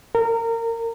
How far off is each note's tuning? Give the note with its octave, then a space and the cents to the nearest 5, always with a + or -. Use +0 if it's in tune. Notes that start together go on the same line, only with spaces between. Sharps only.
A#4 -25